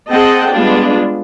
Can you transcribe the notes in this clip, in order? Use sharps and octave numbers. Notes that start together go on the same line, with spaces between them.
C4 G#4 D#5 F#5 G5 A5
G3 G#3 B3 D4 F4